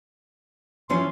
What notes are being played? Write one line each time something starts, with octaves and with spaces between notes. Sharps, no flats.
E3 F3 C#4 C6